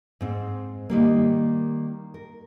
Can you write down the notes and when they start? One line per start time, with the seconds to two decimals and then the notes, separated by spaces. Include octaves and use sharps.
0.21 G#2 C4
0.90 D#3 G3 A#3
2.14 A#4